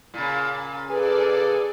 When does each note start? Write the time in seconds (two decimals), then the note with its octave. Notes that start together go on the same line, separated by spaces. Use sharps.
0.14 A#2 C#3
0.90 G#4 A4 B4 D5